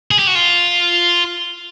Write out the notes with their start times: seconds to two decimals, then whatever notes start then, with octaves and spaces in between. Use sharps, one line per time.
0.11 G#4
0.19 G4
0.27 F#4
0.35 F4